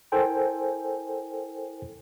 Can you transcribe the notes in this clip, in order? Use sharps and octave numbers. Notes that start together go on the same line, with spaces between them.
E4 A4 A#4 C5 G5 G#5